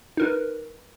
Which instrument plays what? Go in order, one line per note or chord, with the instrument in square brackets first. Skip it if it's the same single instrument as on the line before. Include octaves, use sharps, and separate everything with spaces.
[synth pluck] D#4 A#4 B4